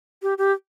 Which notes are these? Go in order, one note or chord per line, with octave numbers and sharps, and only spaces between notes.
G4
G4